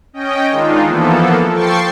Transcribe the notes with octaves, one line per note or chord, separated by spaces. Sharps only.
C#4 D#5 G5
D#3 G#3 D4 D#4 F4
E3 F3 A#3 B3 A4
F3 A4 G5 C#6 A6 C7